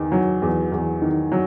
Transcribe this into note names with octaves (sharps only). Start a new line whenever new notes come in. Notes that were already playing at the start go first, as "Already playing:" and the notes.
Already playing: E2 D#3
F#3
E2
E2
D#3
F#3